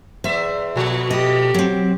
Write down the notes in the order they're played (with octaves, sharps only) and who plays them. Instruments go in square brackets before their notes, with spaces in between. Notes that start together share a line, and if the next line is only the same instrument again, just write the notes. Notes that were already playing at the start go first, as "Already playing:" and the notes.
[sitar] E2 E5 [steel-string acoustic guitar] C5
[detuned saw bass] B2 [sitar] F3 A3
[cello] G4 [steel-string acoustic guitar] D#5
[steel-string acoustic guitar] F#3 C4